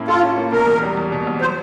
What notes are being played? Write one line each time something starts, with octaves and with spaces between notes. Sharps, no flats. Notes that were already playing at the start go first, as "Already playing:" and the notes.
Already playing: A2 A#3 C#4 E4
F4 A4
C#4
A#3
B2 A#4
E2
G3
E2
B2
E2
F#3 C5